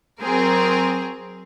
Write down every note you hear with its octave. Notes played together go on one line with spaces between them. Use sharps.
F#3 C4 G#4 A#4